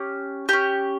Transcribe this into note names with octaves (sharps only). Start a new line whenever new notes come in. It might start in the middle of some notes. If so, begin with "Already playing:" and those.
Already playing: C#4 G4
C#4 G4